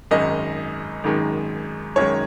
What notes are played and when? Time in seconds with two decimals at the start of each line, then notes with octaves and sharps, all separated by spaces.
0.11 G#1 F#2 D#3 G#3 D#5
1.04 G#1 F#2 D#3 G#3
1.96 G#1 F#2 D#3 G#3 C#5